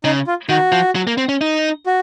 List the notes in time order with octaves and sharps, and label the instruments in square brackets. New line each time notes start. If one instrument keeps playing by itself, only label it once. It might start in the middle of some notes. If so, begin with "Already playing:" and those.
[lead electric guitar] C#3 [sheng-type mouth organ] D#4
[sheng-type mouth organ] F4
[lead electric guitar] D#3 [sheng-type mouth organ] F#4
[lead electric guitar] F3
F#3
A#3
C4
C#4
D#4
[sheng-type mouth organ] F#4